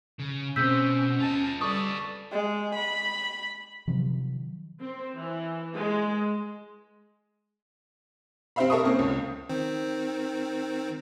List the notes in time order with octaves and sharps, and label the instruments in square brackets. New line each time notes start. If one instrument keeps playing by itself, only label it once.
[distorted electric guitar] C#3
[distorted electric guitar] B2 [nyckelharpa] C4 [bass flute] C#4 [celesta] E6 G6 B6
[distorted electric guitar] F4 D#5 [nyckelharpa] A5
[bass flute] G3 [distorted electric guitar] F4 B4 [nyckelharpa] A4 D5 [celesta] C#6 D#6
[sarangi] G#3
B5
[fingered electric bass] C3 D#3 F3 F#3
[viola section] C4
E3
G#3
[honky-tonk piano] C4 G4 C5 E5 F5 B5
A4 A#4 E5 A5 C#6 D#6
A#3 C4 C#4
C#2
[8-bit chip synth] D#3 C4